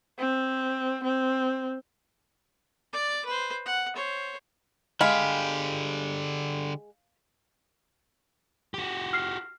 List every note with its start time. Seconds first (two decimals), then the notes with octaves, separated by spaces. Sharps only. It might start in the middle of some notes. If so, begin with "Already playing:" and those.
0.19 C4
1.04 C4
2.93 D5 D6
3.26 B4 C5
3.66 F#5
3.95 C5 C#5
5.01 D3 G#3 G4 F5 B5
8.74 F#4 G4
9.13 F6 C7